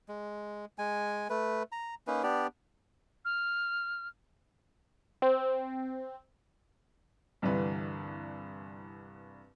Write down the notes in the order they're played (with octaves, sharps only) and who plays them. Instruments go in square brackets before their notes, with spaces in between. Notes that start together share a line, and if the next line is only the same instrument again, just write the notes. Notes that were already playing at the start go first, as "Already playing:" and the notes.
[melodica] G#3
G#3 G#5
A3 B4
A#5
A#3 C#4 D#4 B4
B3 D4 G4 D5
[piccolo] F6
[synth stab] C4
[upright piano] C2 G2 D3 E3 B4 B5